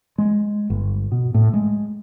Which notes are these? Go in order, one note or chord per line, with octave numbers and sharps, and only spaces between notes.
G#3
G1
B2
A2
G#3